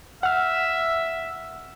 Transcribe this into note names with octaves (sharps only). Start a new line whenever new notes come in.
E5 F#5 F6